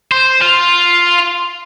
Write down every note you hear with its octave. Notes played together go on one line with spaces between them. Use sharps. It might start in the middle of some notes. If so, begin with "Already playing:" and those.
C5
F4